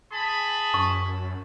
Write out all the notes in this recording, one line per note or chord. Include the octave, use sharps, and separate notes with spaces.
G#4 A5 B5
F#2 C#6